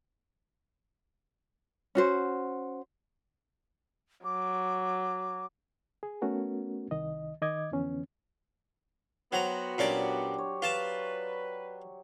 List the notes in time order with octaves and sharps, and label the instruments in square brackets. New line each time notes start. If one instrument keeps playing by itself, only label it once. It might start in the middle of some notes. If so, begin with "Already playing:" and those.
[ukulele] C#4 F#4 C5
[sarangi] F#3 [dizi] D6
[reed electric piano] G#4
A3 B3 C#4 F#4 A#4
C2 D#3 D#5
D#3 D#5 D6 G#6
F2 D3 E3 B3 C#4
[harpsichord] F#3 A#5 [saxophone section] B3 F#4 [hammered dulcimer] C5 G5
[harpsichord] A#2 C#4 D5 [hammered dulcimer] F#3 D4 G4
[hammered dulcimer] C#5
[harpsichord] F4 A5 [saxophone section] B4